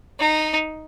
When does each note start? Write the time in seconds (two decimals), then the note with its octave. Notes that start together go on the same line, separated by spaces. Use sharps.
0.19 D#4